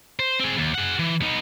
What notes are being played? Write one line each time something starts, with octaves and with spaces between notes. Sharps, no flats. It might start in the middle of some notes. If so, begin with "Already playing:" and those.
C5
C4 G#4
D#2
G#4 F#5
E3
B3 D#4